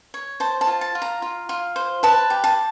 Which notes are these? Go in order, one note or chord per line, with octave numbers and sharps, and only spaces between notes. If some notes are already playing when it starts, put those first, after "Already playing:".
C#5
C5 A5
A5
F4
A5
F4
A#5
F4
F4
C5
B4 A5
G4
A5